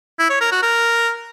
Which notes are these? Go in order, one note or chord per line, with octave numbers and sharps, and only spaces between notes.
E4
C#5
A#4
F#4
A#4